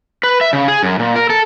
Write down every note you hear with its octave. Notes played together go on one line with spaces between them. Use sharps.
B4
E5
C#3
G#4
F#2
A#2
A#4
A4